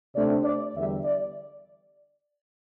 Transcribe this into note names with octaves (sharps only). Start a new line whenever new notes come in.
C3 A3 D4 D5
D5
E2 D3 G3 E5
D5